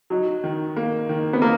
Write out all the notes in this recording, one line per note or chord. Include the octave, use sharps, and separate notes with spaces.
F#3 D#4
D#3
A#3
D#3
B3
A#3